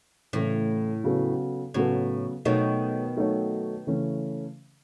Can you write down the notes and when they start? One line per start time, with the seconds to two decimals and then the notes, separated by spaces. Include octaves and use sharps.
0.33 A2 C#3 E3 A3
1.04 C#3 F#3 B3 F#4 A4
1.74 A2 C#3 F#3 B3 F#4 A4
2.45 B2 D#3 F#3 A3 D#4 F#4 C#5
3.17 F#3 A3 D#4 F#4 C#5
3.87 C#3 E3 A3 C#4